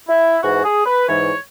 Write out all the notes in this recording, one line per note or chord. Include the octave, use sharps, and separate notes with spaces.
E4
G#2 E3 F#4
G#4
B4
G#2 E3 C#5